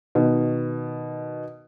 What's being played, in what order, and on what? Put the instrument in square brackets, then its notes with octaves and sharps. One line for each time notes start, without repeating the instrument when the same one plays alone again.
[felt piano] B2 D#3